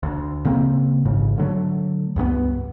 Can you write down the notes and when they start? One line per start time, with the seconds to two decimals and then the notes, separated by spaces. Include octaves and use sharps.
0.03 D2
0.45 C#3 A#3 C4
1.05 A1 G#2 C#3
1.38 D3 F#3 A3
2.16 C#2 G2 G3 B3